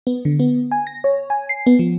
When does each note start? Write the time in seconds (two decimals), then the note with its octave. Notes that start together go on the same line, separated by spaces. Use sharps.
0.07 B3
0.25 D3
0.39 B3
0.71 G#5
0.87 A#6
1.04 C#5
1.30 G#5
1.49 C7
1.66 B3
1.79 F3